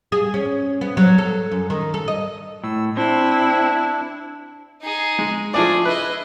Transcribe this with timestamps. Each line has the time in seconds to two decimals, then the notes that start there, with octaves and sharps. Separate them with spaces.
0.12 G#4
0.34 C#4
0.81 B3
0.97 F#3
1.18 A4
1.52 F#2
1.70 D#3
1.94 A4
2.08 D#5
2.64 A2 E6
2.97 C4 D4 E4
4.82 D#4 G#4
5.19 G#3
5.54 F3 A3 D4 G#4 D5
5.85 E4 B4 D#5